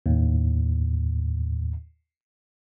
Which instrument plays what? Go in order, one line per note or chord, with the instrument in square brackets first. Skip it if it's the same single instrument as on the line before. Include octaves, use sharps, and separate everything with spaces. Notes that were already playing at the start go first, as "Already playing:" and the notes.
[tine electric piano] D#2 A2